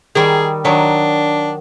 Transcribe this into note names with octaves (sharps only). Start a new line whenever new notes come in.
D#3 G3 G#4
D#3 F#3 D4